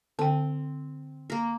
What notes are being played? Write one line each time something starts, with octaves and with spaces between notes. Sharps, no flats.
D3 C4 G5
A#3 A#4